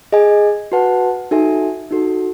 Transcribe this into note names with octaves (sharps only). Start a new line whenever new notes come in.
G#4 D#5 G#5
F#4 B4 F#5 A5
D#4 F#4 A4 E5 G#5
D#4 F#4 A4